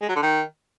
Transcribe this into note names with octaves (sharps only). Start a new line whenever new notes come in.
G#3
F#3
D3
D#3